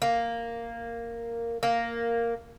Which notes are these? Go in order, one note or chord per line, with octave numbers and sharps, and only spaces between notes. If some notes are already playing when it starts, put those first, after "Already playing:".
A#3
A#3